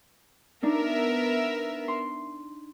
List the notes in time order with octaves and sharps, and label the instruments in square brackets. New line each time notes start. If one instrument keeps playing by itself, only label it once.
[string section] B3 A#4 E5 [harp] D4 D#4
[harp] C6